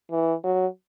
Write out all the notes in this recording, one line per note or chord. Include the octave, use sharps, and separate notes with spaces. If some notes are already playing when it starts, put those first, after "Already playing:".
E3
F#3